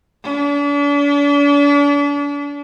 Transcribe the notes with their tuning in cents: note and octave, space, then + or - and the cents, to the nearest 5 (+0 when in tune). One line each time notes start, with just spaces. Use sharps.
D4 -40